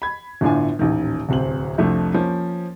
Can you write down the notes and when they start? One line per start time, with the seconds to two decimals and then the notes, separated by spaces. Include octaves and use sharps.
0.02 B5 G#6
0.41 G1 A2 D3 D4 F4 G#5
0.79 D#1 A1 D#3
1.29 D1 C2 C4 F#7
1.78 C2 F2 F3 A3 D4 E4
2.14 F3 A#3 C#4